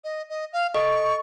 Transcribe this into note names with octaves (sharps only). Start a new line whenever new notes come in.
D#5
D#5
F5
A4 D#5 C#6